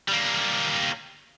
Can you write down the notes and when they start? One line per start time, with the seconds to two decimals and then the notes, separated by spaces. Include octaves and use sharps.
0.08 G3 A#3